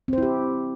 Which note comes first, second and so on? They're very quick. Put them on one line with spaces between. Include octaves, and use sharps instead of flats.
C4 C5 E4 G4